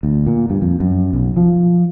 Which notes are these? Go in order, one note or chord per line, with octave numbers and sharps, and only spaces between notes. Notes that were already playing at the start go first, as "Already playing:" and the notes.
D2
A#2
G2
F2
F#2
B1
F3